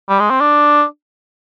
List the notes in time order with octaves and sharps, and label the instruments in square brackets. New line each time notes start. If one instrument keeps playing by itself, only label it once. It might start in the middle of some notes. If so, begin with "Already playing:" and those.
[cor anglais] G3
G#3
C4
D4